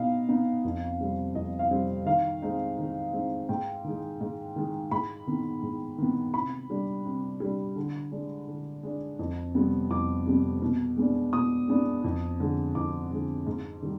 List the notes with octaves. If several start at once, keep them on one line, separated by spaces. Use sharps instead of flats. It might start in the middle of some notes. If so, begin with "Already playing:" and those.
Already playing: B2 B3 D#4 D#5 F5
B3 D#4
F2
C3 G3 C4
F2 D#5
F5
C3 G3 C4
D#3 F5
G#3 C4 D#4
D#3
G#3 C4 D#4
G#2 G5
D#3 G#3
G#2
D#3 G#3
G#2 B5
D#3 B3
G#2
D#3 B3
C3 B5
G3 D4
C3
G3 D4
D3
G#3 D4
D3
G#3 D4
F2
C3 G3 B3
F2 D6
C3 G3 B3
B2
G#3 B3 D4
B2 D#6
G#3 B3 D4
F2
D3 G#3
F2 D6
D3 G#3
G#2
D#3 G3